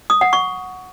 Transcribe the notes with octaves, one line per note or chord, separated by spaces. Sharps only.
D#6
F#5
C#6